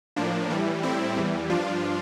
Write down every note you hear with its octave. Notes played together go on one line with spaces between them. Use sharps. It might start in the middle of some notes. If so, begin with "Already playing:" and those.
A2 F3 A#3 D4
A2 E3 G3
A2 G3 C4 E4
E2 E3 G3
G2 F3 D4 F4